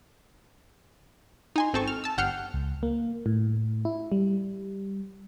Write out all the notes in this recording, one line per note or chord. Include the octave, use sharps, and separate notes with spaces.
D#4 G#5 C6
G#1 C4 A4 C#6
F6
A5 E6
G1 F#5 G5 F6 C7 C#7
C#2
A#3
A2
E4
G3